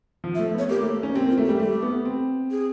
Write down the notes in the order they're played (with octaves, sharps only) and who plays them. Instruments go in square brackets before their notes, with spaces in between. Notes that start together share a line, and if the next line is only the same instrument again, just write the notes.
[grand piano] F3
[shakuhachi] E5
[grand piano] A3
[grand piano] B3 [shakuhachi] C#5
[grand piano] A#3 [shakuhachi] G4
[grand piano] A3
A#3
C#4
[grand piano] C4 [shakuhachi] G4
[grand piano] A#3 [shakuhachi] F4
[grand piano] A3
[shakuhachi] G4
[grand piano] G3
[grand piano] A3 [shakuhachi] G4
[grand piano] B3
C4
[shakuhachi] G#4